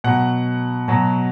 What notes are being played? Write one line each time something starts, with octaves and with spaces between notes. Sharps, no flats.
B2 F#3 F#5
B2 F#3